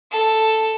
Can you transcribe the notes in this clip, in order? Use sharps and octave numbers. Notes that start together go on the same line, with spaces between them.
A4